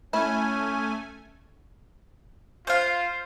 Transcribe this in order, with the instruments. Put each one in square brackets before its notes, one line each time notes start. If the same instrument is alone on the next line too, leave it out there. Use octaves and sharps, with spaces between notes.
[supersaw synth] A3 G#5 [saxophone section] C#4 [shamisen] E4
[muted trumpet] F4 [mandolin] C5 F5